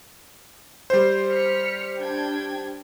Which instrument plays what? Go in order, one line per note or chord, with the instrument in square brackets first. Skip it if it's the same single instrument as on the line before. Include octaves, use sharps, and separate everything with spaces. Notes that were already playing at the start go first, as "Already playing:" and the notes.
[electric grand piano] G3 C5
[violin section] F6 B6 C#7
D4 G5 G#6